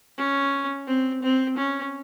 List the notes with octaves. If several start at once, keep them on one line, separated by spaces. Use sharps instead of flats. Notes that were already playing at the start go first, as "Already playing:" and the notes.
C#4
C4
C4
C#4